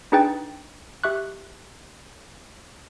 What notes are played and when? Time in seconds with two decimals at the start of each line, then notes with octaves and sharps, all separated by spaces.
0.12 D4 D#4 G#4 B4 G5 A6
1.04 G4 E5 C#6 F#6